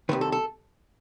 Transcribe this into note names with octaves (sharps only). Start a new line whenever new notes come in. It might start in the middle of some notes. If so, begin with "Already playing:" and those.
C2 C3 D#3 B4
A4
A4